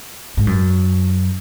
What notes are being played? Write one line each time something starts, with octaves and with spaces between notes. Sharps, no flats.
G#2
F#2